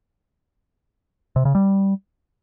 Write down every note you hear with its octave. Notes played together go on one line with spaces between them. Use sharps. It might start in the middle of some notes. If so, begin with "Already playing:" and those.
C3
C#3
G3